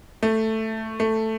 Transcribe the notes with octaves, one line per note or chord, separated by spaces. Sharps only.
A3
A3